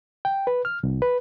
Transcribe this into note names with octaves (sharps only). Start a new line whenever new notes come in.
G5
B4
F6
C2
B4